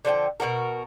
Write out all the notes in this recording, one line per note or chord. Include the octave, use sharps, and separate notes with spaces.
D3 F3 C#5 G5
B2 F3 F#4 A#4